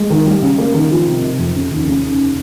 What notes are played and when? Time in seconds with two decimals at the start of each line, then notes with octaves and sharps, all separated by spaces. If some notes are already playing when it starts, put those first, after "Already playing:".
Already playing: G#3
0.10 D#3
0.26 G3
0.42 C#3
0.58 A#3
0.74 D#3
0.91 F3
1.07 C3
1.22 C3
1.39 F2
1.54 C#3
1.71 D#2
1.87 C#3